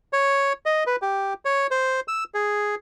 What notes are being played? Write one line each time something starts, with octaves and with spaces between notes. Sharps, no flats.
C#5
D#5
B4
G4
C#5
C5
E6
G#4